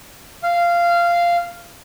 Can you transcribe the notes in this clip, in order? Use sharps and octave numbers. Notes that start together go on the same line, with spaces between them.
F5